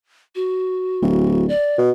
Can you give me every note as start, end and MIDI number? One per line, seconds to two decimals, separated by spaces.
0.35 1.45 66
1.02 1.50 26
1.49 1.77 74
1.78 1.91 47